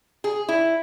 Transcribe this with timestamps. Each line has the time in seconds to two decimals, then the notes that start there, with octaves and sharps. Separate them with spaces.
0.24 G#4
0.49 E4